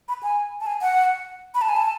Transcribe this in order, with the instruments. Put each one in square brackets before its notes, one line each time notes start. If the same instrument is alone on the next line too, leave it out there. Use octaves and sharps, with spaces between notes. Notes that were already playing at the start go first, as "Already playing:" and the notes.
[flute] B5
G#5
A5
G#5
F#5
B5
A5
G#5
A5